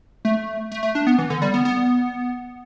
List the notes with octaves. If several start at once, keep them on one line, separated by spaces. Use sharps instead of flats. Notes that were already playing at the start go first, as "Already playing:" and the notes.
A3
A3
A3
D4
B3
E3
D3
G3
B3
B3